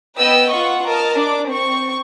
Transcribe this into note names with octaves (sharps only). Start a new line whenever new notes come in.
B3 B4 D#5 G5 E6
F4 F#5 C#6
A#4 D#5 A5 F6
D4 D6
C4 C#6